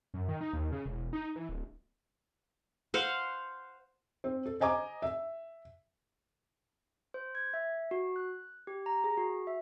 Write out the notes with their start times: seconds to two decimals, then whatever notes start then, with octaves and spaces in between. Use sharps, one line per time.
0.14 F#2
0.29 D#3
0.41 D#4
0.53 D#2
0.72 C#3
0.86 E1
1.13 D#4
1.36 E3
1.49 D1
2.94 C5 F5 F#5
4.24 C4
4.46 A4
4.60 C5 D#5 G#5 A#5 D6
5.02 E5
7.14 C5
7.35 G#6
7.54 E5
7.91 F#4
8.16 F#6
8.67 G4
8.86 A#5
9.04 G#4
9.17 F#4
9.47 E5